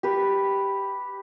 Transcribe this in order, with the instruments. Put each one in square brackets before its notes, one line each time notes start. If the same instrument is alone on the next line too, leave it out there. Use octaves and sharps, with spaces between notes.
[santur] G4 B4